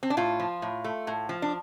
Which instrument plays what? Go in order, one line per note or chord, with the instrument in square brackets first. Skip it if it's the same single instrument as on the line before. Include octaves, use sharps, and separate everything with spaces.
[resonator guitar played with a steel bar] C4
D4
A2 F4
F3
A2
A3
A2
F3
D4